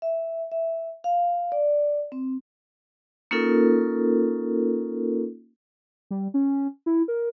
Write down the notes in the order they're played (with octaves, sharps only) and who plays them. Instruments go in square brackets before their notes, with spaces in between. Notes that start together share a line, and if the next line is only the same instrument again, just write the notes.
[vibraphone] E5
E5
F5
D5
C4
A#3 C#4 D#4 F4 A4 A#4
[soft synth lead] G3
C#4
E4
A#4